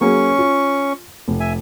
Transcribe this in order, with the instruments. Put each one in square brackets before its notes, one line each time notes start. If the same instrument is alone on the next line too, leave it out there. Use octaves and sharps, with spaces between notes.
[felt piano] F#3 A#3 G#4 [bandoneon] C#4 C#6
[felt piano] F4
F1
[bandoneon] E5 G#5